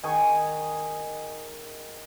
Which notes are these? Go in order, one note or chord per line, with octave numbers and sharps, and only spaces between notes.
D#3 G#4 G#5 C#6